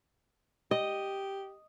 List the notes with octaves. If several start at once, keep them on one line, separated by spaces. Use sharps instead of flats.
G4 D#5